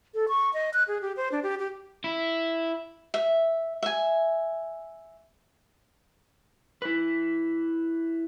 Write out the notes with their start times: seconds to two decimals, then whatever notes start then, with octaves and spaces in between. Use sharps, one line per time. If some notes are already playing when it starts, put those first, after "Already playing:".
0.14 A4
0.28 C#6
0.54 D#5
0.74 F#6
0.88 G#4
1.01 G4
1.17 C5
1.32 D4
1.43 G4
1.59 G4
2.04 E4
3.14 E5
3.83 E5 G#5
6.82 E4 B4